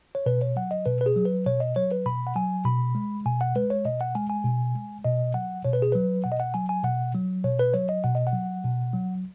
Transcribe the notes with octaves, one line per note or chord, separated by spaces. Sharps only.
C#5
B2 B4
C#5
F#3 F#5
D#5
B2 B4
B4
G#4
F#3
B4
B2 C#5
D#5
F#3 C#5
B4
B2 B5
F#5
F#3 G#5
B2 B5
G#3
B2 G#5
F#5
G#3 B4
C#5
B2 D#5
F#5
G#3 G#5
G#5
B2
G#3
B2 D#5
F#3 F#5
B2 C#5
B4
G#4
F#3 B4
B2 F#5
D#5
F#5
F#3 G#5
G#5
B2 F#5
F#3
B2 C#5
B4
F#3 C#5
D#5
B2 F#5
D#5
F#5
F#3
B2
F#3